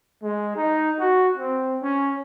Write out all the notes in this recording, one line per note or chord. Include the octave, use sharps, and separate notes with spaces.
G#3
D#4
F#4
C4
C#4